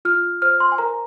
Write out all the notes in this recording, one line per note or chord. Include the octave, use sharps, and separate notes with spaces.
F4 F6
C5 F6
C6
G#5
A#4 A#5